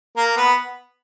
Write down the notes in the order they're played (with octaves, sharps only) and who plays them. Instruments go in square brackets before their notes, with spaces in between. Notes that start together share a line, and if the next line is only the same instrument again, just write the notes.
[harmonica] A#3 A#4
B3 B4